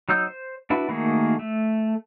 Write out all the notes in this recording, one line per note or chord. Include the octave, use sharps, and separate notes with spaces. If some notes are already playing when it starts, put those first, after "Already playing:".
F#3 D#4 E6 G6
C5
D4 E4 F#4 B4 B5
D#3 A3 A#3 F#4 G#4
A3